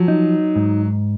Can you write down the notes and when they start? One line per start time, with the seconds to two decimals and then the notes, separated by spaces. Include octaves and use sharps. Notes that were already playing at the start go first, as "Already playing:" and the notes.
Already playing: F3 F#3
0.08 D#4
0.56 G#2